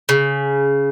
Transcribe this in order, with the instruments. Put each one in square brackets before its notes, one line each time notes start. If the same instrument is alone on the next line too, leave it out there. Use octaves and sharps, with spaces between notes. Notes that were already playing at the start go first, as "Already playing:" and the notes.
[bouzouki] C#3